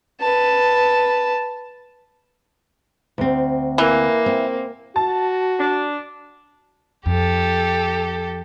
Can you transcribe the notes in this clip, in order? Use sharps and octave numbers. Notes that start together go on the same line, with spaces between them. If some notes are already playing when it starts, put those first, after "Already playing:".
B4 A5
D2 C4
E3 A#3
C4
F#4 A5
D4
F2 G4 A4